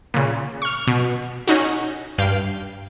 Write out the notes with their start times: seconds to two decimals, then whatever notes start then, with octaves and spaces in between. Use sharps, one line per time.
0.14 A#2 C#3
0.62 C#6 F6
0.87 B2
1.47 C#4 D#4 F#4
2.18 G2 F5 G5